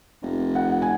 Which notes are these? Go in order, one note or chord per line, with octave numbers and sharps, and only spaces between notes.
F1
F#5
G#5